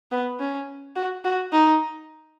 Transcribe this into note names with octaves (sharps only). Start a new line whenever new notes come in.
B3
C#4
F#4
F#4
D#4